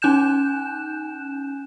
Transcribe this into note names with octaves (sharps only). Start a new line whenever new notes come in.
C#4 D#4 G#5 F#6 G6 E7